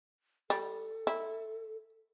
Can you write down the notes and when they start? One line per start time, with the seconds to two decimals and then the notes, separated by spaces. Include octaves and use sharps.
0.50 G3 A4
1.07 E4